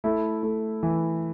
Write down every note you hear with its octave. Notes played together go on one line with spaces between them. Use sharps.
A3 E4
A3
E3